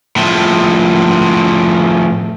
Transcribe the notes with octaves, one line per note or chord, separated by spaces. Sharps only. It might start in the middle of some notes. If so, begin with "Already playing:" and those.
A2 F3